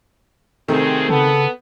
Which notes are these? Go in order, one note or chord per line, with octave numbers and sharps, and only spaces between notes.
D2 C3 D#3 A3 C4 G#4
C#3 B3 A4